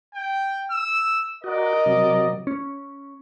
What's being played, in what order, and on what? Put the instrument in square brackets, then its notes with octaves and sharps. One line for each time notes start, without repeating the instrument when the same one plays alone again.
[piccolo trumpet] G5
E6
[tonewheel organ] F#4 [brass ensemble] A#4 D5 D#5
[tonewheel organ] C3 F#3
[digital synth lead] C#4